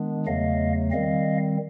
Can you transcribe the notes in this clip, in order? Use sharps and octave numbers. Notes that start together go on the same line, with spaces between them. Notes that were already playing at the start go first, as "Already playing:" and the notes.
Already playing: D#3 G#3 B3 D4
E2 C#3 F#3 A3 D#5 F5
D#3 G3 C4 D#5 F5